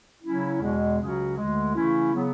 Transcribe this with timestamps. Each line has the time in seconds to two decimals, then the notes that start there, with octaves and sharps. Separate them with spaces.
0.23 C#3 F#3 C#4 E4
0.61 E2 B2 G#3
0.99 C#2 C#3 F#3 C#4 F#4
1.37 D2 D3 G#3
1.75 C#3 E3 A3 C#4 E4
2.13 C#3 F#3 B3